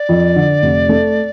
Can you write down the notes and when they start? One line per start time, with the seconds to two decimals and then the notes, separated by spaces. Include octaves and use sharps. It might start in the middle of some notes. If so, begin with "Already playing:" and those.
Already playing: D5
0.09 F2
0.36 D3
0.62 F1
0.89 A3